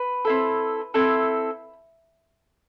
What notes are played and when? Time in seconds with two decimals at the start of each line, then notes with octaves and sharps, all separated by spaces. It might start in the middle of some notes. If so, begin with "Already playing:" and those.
Already playing: B4
0.25 C4 E4 A4
0.94 C4 E4 A4